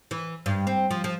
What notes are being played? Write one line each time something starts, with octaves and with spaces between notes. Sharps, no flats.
E3
G2
C4
F3
F3